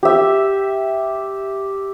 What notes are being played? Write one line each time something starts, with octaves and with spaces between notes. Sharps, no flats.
G4 E5